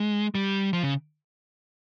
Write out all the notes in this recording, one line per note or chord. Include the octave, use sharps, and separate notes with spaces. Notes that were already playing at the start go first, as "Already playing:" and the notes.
Already playing: G#3
G3
F3
C#3